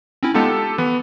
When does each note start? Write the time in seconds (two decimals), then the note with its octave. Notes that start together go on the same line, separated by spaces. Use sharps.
0.23 C4 C#4 E4
0.34 G#3 B3 D#4 F4 G4 A4
0.78 E3 B3